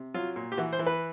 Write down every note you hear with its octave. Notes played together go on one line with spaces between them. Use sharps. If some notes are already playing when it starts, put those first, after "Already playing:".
Already playing: C3
F#3 F4
A#2
G4
E3 F#4
C5
E3
B4